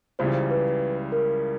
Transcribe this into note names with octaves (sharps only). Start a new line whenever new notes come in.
C#2 C#3 E3 G3 C5
C5
B4
A#4